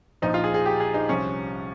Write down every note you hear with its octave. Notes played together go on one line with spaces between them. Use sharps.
A#1 A#2 F3 D#4
F4
G#4
G#4
G4
G#4
D#4
C2 C3 F3 C#4